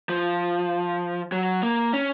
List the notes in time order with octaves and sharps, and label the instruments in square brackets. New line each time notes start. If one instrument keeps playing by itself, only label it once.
[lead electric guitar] F3
F#3
A#3
C#4